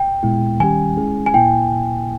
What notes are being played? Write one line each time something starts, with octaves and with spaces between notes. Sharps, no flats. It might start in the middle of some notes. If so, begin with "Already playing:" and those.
Already playing: G5
A#2 G#3 B3 E4
D#3 G3 C#4 G4 G#5
G#3 C#4 E4 G#4
G#5
A#2 A#3 E4 G5